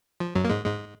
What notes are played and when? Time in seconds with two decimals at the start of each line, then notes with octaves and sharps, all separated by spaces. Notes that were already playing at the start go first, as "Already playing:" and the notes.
0.20 F3
0.35 F#2 F#3
0.45 A#3
0.50 G#2 G#3
0.65 G#2 G#3